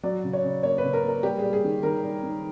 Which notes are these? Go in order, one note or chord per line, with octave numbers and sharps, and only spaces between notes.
F#3 D5
C#3
C#5
C#3
A#3 C#5
B4
C#3
A#4
A#3 A#4
G3 G4
G3 G#4
G#4
D#3
D#3 A#4
G3
D#3